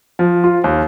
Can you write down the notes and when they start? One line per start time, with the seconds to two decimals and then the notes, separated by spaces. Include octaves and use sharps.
0.19 F3
0.44 F4
0.64 D#2